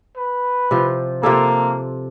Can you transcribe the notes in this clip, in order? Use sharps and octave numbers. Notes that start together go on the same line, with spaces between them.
B4
C3 F3
C3 A#3 F4 A4